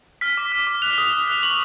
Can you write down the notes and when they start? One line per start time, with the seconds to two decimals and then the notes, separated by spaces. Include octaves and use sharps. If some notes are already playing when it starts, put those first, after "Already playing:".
0.21 F6 B6
0.37 D6
0.52 F6
0.67 D6
0.82 F#6 F7
0.98 D#6
1.13 F#6
1.28 F#6
1.43 C#6 F#7